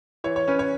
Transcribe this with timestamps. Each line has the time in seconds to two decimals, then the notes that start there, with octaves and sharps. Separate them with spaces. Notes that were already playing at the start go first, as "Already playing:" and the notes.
0.24 E3 C#5
0.36 C#5
0.48 C#4 B4
0.59 C#5